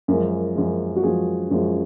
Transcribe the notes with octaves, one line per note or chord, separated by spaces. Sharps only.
F#2 F3 G#3 A#4
F#2 F3 G#3
F#4
F#2 F3 G#3 G#4
F#2 F3 G#3